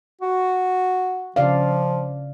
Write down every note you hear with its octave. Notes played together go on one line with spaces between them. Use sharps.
F#4
C#3 F3 D5 F5